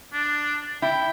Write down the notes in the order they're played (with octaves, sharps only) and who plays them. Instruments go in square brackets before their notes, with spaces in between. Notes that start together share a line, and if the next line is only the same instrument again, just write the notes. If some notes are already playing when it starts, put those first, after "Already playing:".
[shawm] D4
[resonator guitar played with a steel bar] E4 [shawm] G5